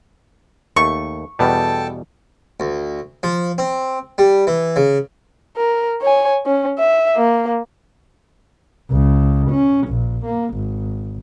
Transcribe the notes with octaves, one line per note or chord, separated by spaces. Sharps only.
D#2 A3 C#6
E2 B2 G3 A4 G5 A5
D2
F3
C4
G3
E3
C#3
A#4
C#5 G#5
C#4
E5
A#3
C#2
C#4
A#1
A#3
G#1